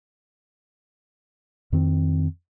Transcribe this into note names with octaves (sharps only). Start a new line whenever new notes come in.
F2 D#3 C4